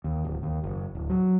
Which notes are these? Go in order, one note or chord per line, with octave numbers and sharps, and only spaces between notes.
D#2
D1
D#2
F#1
D1
F#3